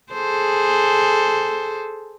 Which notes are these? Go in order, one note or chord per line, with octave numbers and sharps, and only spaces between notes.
G#4 A4 C5